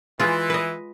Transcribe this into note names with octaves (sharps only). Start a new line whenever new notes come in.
E3 G#3 F4
B4 D#5